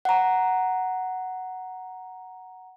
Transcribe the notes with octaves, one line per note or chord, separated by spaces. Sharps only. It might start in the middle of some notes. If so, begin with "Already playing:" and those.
F#5 A#5